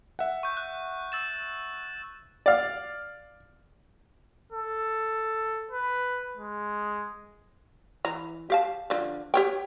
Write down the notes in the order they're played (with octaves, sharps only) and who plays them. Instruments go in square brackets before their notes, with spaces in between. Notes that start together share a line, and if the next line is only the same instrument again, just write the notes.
[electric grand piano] E5 F#5
[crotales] C#6 G6
F#6
E6 A6 E7
[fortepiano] D5 F5
[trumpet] A4
B4
G#3
[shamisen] E3 A#5
G4 F5 A5
D3 F3
G4 C#5 G5